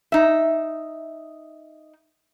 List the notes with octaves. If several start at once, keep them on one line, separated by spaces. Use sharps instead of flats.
D#4 E5